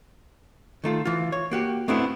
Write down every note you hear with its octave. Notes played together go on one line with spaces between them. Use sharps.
D#3 A3 F4
E3 F4
C#5
A#3 F#4 G4
A3 B3 C4 D4 E4 F#4